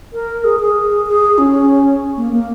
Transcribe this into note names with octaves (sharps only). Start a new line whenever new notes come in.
A#4
G#4
G#4
G#4
C#4
A#3
A#3